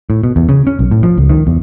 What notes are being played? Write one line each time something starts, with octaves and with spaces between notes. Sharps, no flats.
A2
B2
E2
C#3
C#4
B1
A2
F3
C#2
D#3
E2